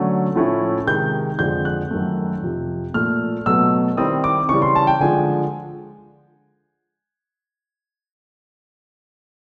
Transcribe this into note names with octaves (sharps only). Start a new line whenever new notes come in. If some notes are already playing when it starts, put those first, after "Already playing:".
Already playing: D3 F#3 A3 C#4
A2 F3 A3 C#4 E4
C3 D#3 G#3 G6
F2 D3 F3 G#3 C4 G6
F#6
F#2 D#3 F#3 A3
F2 C3 F3
A#2 F3 A3 F6
B2 F#3 A3 E6
D#3 G3 C4 E4 D#6
D6
C#3 E3 G3 C#6
C6
A5
G5
D3 F3 G#3 G#5